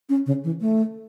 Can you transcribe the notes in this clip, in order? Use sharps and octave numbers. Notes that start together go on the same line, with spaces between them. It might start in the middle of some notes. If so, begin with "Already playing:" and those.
C#4
C#3
E3
A3